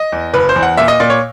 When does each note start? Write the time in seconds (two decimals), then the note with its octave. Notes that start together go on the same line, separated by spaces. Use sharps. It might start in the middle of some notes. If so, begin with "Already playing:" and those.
Already playing: D#5
0.12 E2
0.34 F#1 B4
0.49 C5
0.56 E2
0.63 F#5
0.77 A#2 E5
0.88 D#5
1.00 A#2 D5
1.10 C#5